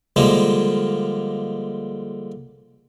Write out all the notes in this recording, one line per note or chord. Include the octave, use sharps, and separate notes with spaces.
D3 F3 G3 G#3 A#3